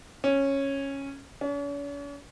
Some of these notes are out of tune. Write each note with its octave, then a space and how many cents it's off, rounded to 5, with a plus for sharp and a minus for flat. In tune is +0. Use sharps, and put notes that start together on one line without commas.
C#4 -10
C#4 +45